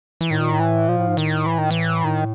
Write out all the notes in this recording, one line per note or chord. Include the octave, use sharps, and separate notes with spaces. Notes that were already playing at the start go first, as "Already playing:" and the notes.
E3
A2 D#3
A#2
A2
E3
A#2 F3
A2
G#2
A2 D#3
E3
D#3
E3
A2 D#3